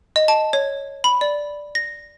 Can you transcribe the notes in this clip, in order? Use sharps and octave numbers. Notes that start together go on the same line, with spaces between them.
D#5
A5
C#5
B5
D5
A#6